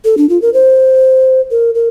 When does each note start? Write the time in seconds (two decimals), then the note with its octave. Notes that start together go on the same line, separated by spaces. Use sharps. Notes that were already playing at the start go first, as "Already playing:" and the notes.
0.05 A4
0.18 D4
0.29 F4
0.42 A#4
0.54 C5
1.51 A#4
1.75 A#4